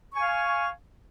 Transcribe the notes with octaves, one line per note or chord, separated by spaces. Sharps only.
F5 G#5 C#6